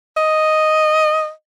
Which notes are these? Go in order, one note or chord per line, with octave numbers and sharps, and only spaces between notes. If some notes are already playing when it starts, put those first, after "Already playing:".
D#5